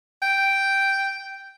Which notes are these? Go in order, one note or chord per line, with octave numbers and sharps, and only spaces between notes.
G5